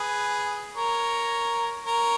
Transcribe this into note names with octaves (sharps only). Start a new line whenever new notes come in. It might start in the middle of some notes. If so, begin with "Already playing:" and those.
Already playing: G#4 B4
A#4 C#5
A#4 C#5